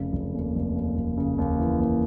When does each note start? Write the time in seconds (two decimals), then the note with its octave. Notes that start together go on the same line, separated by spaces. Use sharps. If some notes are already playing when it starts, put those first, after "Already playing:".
Already playing: F1 C#3
0.13 F1
0.34 D#2
0.55 F1
0.75 D#2
0.97 F1
1.18 C#3
1.38 D#2
1.59 E3
1.80 D#2